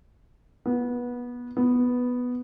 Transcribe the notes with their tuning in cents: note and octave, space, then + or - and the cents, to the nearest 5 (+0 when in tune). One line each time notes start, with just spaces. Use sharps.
B3 -20
B3 +0